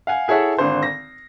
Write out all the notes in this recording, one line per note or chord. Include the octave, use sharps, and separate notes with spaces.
F5 F#5 G#5
E4 G#4 A4 C#5 E5 F#5
G#1 D3 C5
A#6